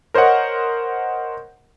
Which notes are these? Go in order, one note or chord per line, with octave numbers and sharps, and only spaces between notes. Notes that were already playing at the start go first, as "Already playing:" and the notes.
A#4 C5 C#5 D#5 F#5